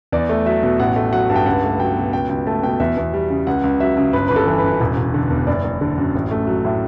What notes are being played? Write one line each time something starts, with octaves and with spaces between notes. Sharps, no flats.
E2 D5
A3
F#3 E5
B2
A1 F#5
A3
F#3 F#5
G2
G5
C#2 F#5
A3
F#3 G5
B2
C#2 G5
C#2 G5
A3 A5
B2 G5
E2 E5
E2
G3
C#3
C#2 F#5
C#2
F#3 E5
C#3
G1 B4
G1 B4
A4
E3
B4
F#2
E1
E1
D3
E2
F#1 D5
F#1
D3
F#2
A1
A3
F#3
A2